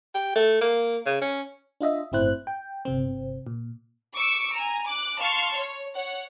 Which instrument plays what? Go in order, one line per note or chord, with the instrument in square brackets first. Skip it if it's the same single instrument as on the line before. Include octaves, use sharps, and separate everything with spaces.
[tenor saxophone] G4
A3
A#3
C#3
C#4
[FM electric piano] D4 F4 D#5 E5
G1 A2 C4 E4 C5 F#6
G5
G1 C3 C4
A#2
[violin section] C#6 D6 E6 C#7 D7
G#5 A#5
D6 F#6
F5 A5 C6 C#6 F6
C#5
C#5 F#5